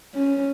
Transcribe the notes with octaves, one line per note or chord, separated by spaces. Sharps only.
C#4